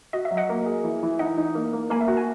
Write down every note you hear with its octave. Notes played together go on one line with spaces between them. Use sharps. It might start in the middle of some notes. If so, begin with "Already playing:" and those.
F#4 D#5
E5
F#3
D#5 F#5
A#3
G#4
E3
E3
D#4 D#5 F#5
D#4
A#3
A#3
A#3 G#5 B5
E5
F#4 F#5
G#5